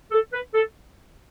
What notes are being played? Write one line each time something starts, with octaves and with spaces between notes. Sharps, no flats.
A4
B4
A4